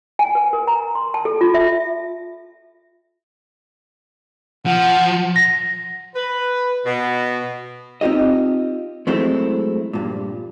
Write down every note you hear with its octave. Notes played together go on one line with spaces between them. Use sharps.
G#5
B4
A#4
A#5
C6
A5
A4
F4
E5
F3 F#5
A#6
B4
B2
C4 D#4 F4 G4 D#5
F#3 G#3 A3 C4 E4
G2 A#2